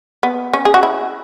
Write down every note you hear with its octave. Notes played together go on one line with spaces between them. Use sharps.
B3
C#4
G#4
F#4
E4